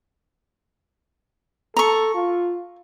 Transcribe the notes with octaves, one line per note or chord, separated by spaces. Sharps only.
A4 A#5 C#6
F4